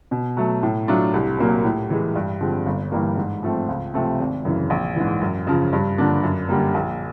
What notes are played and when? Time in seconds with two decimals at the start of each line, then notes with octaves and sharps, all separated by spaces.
0.11 B2
0.37 F#3 A3
0.63 A2
0.88 F#3 A3 D4 F4
1.14 C2
1.39 A#2 F#3 A#3
1.64 A2
1.90 E3 G#3
2.15 G2
2.41 D3 F3 G#3 C4
2.66 G1
2.92 G2 E3 G3 A#3
3.17 G#2
3.43 F3 A3 C4
3.68 C#2
3.94 C3 F3 A3 C4
4.19 G#1
4.45 F#2 C#3 E3
4.70 A#1
4.96 G#2 E3
5.21 F#2
5.47 C#3 F3
5.73 G2
5.98 D3 F3 A#3 D4
6.23 F#2
6.49 D3 G3 A#3
6.74 A#1